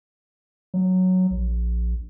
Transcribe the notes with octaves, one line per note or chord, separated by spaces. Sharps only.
F#3
A#1